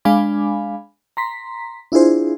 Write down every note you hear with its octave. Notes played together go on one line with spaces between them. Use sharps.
G#3 D4 F5 G#5 B5 D6
A#5 C6 B6
D4 E4 F4 G#4 C5